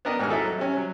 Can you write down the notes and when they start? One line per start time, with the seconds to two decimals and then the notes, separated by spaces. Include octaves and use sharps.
0.05 B3 D4 A#4 D#5
0.19 D#2 G#2 G#3 G#4 F6
0.30 D#4 E4 F#4 A4
0.45 F#3
0.58 C3 C#4
0.77 F#3